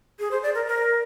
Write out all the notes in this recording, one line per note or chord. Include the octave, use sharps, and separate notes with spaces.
G#4
C5
D5
A#4
A#4